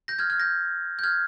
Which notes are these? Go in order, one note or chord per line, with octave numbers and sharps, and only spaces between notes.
G6 A#6
F6 G#6
F6 G#6
G6 A#6
G6
F6 G#6